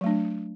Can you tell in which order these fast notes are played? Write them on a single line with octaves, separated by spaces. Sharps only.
F#3 A3 D4